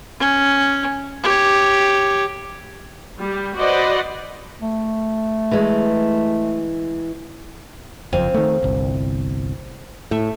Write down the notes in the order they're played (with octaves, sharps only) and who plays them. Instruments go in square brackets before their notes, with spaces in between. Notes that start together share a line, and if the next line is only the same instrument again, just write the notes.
[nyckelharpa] C#4
G4 C#5
[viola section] G3
F#4 B4 C5 D5 D#5 F#5
[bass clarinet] A3
[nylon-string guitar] E3 G#3
[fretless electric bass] F#1 F2 [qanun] C4 F5 G#5
[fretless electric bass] D#3 A3
G1 C2
[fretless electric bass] A2 [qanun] A3 E5